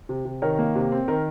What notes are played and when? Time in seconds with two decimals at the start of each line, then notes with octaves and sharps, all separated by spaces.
0.09 C3
0.25 C3
0.42 D#3 A#4 C#5
0.59 A#3
0.75 C3
0.92 C4
1.08 D#3 A#4